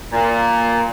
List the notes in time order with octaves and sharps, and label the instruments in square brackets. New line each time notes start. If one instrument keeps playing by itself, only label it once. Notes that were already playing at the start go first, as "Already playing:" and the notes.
[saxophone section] A#2